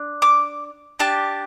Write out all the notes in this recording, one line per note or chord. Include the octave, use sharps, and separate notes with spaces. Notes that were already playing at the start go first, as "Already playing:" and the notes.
Already playing: D4
D6
D4 G4 A5